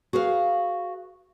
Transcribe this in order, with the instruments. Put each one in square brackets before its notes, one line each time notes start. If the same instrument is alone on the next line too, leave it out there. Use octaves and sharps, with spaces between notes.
[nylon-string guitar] F#4 G#4 B4 F5